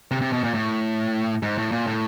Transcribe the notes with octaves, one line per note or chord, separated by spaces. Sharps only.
C3
C3
B2
A#2
A2
G#2
A2
A#2
A2